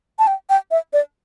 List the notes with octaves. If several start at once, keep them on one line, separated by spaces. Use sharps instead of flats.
A5
G5
G5
E5
D5